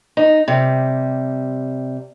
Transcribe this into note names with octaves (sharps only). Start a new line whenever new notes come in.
D#4
C3 G3